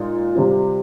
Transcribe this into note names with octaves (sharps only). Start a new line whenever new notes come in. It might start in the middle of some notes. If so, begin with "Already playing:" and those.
Already playing: A#2 G#3 D#4
C3 G3 C4 F4